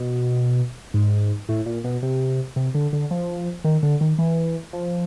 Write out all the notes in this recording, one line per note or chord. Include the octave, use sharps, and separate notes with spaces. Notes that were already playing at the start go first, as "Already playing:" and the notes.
Already playing: B2
G#2
A2
A#2
B2
C3
C3
D3
D3
F3
D#3
D3
D#3
E3
F3